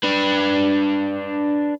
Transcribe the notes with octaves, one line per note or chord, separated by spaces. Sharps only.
D4 B4